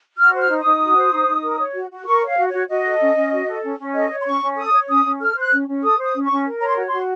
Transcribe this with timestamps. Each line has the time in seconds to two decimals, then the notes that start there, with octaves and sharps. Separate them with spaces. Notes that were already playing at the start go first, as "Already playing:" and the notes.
0.18 F#4 F6
0.34 C5 F6
0.50 D#4
0.60 D#4 D#6
0.81 F#4
0.97 C5
1.12 D#4
1.27 D#4
1.43 A#4
1.59 C#5
1.75 F#4
1.91 F#4
2.06 A#4 C#6
2.22 C#5
2.27 F5
2.38 F#4
2.48 F#4 C#5
2.69 F#4 D#5
2.85 A4
3.01 C#4
3.16 C#4
3.32 F#4
3.48 A4
3.63 C#4
3.79 C#4
3.94 A4 D#5
4.10 C#5
4.21 C6
4.26 C#4 C#6
4.41 C#4
4.57 A4 D#6
4.73 C#5
4.89 C#4 D#6
5.04 C#4
5.20 A4 F6
5.36 C5
5.41 F#6
5.51 C#4
5.67 C#4
5.83 A4 D#6
5.98 C5
6.04 D#6
6.14 C#4
6.25 C#6
6.30 C#4
6.46 A#4
6.60 C#5 A#5
6.67 C6
6.77 F#4
6.87 C6
6.92 F#4